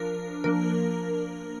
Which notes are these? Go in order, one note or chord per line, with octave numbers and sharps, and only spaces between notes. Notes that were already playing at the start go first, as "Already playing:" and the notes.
Already playing: F3 D4 A#4
F3 A#3 D4 A#4